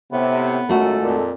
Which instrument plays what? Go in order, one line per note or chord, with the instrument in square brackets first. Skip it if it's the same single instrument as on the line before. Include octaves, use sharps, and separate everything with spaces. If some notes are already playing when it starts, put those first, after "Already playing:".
[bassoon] A2 [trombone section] C3 [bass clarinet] B3
[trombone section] G#1 G#3 A4 [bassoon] F#2 [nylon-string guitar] A3 F4 F#4
[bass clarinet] F2 [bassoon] A#2